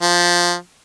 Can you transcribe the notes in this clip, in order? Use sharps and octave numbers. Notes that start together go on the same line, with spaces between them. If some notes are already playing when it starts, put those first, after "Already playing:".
F3